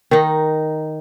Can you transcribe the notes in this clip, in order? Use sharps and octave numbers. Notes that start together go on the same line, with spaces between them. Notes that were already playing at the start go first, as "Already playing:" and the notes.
D#3 D#4